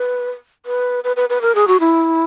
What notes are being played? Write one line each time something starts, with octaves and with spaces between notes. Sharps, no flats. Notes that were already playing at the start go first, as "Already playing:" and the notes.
Already playing: B4
B4
B4
B4
B4
A#4
G#4
F#4
E4